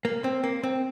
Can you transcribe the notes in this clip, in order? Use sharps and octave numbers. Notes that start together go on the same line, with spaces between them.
A#3
C4
A#3
C4